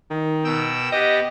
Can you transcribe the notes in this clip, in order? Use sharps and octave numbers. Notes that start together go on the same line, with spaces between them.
D#3
B2 G5 E6
B3 G4 D#5